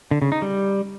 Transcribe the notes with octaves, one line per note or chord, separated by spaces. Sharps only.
D3
C#3
D#4
G3